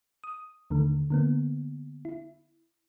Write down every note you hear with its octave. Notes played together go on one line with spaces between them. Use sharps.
D#6
D#2 D3 D#3 A3
D3 A#3 B3
E4